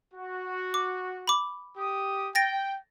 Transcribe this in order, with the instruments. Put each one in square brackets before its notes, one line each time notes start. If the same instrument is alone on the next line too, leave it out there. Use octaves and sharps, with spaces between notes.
[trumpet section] F#4
[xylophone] D6
B5 D6
[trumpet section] G4 D#6
[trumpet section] G5 [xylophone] A6 A#6 D7